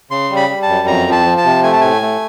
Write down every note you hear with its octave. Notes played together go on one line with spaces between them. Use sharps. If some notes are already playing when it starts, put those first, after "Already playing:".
C#3 C6
G3
B5
G3
A5
F#2
F2 A#5
F3
A5
F3
A5
C3
A3 G#5
A5
A2 G#5
A3